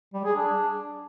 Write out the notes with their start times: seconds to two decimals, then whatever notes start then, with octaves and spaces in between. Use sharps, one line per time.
0.14 G3
0.25 G#4
0.36 D4